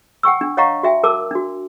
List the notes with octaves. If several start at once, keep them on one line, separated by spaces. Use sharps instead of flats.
F#5 G5 C#6 E6
D4
C#5 D#5 F5 F#5 A#5 C#6
F#4 E5 G5
A#4 A5 D6 E6
D4 F#4